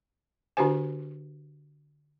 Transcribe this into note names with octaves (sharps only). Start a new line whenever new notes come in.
D3 D4 F#4 G4 C5 G#5